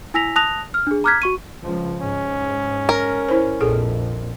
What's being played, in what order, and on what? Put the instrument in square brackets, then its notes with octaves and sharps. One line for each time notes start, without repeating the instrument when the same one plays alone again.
[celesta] E4 G#5 E6 A#6 B6 F7
A5 D#6 F#6 A#6 F7
F6
D4 G#4
A#5 D6 F6 F#6 G#6 B6
F#4 C#6 D#7
[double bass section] C#2 F3
[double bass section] G#2 [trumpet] C#4
[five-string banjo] A#4
[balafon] E4 C5
[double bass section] A#1 F2 [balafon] G#4 A4